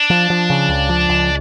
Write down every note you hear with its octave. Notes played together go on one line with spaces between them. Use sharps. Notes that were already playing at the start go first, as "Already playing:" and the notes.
Already playing: D4
F3
F3
C#3
C#2
F3
C#2